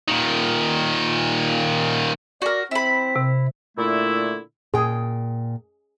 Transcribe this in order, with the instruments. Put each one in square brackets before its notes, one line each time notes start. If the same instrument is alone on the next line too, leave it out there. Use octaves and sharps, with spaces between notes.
[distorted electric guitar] A#2 D#3
[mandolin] F#4 A#4 [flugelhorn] D5
[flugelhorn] C4 [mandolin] E4 B5
[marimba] C3
[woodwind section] A#2 D3 A3 E4
[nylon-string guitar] A#2 G5 [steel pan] G#4